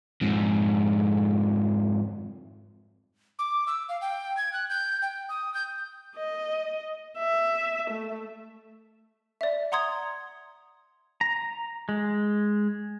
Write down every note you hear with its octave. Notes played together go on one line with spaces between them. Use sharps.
F2 G#2
D6
E6
F5
G5
G#6
F#6
G6
G5
D#6
G6
D#5
E5
A3
D5 E5
F#5 A#5 C6 D#6 G#6
A#5
G#3